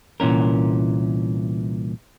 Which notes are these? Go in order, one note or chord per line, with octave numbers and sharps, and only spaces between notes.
C2 A#2 E3 C#4 A#4